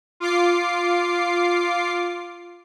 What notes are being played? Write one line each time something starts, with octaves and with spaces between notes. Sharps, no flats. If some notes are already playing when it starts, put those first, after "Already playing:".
F4 D6 C7